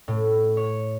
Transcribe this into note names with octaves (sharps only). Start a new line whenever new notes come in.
A2
C#5